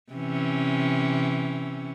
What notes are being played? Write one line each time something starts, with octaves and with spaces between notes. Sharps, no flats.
C3 E3 C#4